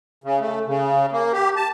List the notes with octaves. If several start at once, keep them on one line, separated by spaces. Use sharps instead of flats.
C#3
A3
C#3
A#3
G4
A5